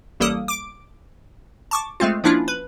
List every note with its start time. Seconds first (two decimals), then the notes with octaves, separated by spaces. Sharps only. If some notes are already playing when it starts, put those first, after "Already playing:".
0.20 A1 G3 A#3 A4 D#6
0.48 D6 D7
1.71 A5 C#6 D6
2.00 G#3 A3 C4 F4
2.24 F3 A#3 C#4 D4 E4 F4
2.48 B4